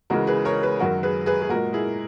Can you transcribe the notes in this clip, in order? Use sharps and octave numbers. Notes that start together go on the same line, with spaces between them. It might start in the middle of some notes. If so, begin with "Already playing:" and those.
C#2 C#3 E3 G#3 F#4 A#4
G#4 B4
A#4 C#5
G#4 B4
F#2 D#3 F#3 F#4 A#4
G#4 B4
G#4 B4
G#4
A#2 G#3 F#4 A#4
E4 G#4